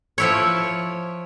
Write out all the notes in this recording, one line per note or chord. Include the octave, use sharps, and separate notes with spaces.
F3 E4 C#5